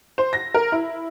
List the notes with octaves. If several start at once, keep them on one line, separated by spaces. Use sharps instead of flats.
C5
A#6
A#4
E4